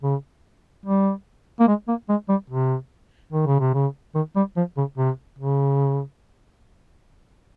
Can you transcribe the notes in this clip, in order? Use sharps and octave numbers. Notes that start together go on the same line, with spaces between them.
C#3
G3
A#3
G#3
A#3
G#3
G3
C3
D#3
C#3
C3
C#3
D#3
G3
F3
C#3
C3
C#3